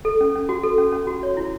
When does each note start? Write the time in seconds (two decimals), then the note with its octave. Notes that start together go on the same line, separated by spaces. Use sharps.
0.05 A4
0.21 C#4
0.35 C#4
0.49 F#4
0.63 A4
0.78 C#4
0.93 C#4
1.07 F#4
1.23 C#5
1.37 E4